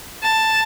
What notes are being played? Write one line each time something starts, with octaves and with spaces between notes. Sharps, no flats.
A5